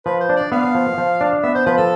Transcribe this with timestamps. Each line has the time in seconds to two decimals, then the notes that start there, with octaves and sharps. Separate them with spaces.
0.06 F3 B4
0.21 C5
0.29 D4
0.36 D5
0.52 B3 F5
0.75 F3
0.98 F3
1.21 D4
1.43 B3 E5
1.55 C5
1.66 F3 B4
1.78 A4